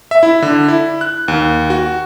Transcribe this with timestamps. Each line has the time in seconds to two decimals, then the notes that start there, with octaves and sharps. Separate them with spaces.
0.11 E5
0.23 E4
0.42 D3
0.68 E4
1.01 F#6
1.28 D#2
1.70 F#4